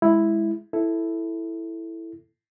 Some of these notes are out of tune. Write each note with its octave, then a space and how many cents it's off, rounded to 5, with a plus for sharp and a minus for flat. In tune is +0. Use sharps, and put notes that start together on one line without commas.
G#3 +0 E4 +0
E4 +0 A4 +0